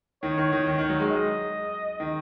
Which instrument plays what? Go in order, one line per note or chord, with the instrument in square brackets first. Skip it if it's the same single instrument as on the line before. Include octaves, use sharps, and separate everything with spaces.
[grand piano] D#3 [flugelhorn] C#5
[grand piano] D#3
D#3
D#3
D#3
F#3
G#3
[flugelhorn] D#5
[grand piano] D#3